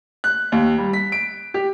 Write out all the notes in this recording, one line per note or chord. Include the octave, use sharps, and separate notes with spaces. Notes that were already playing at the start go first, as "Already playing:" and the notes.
F#6
D#2
G3
B6
D7
G4